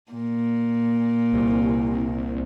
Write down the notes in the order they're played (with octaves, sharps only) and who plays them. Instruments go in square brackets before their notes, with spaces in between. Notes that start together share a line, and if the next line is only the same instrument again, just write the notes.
[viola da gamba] A#2
[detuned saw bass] C2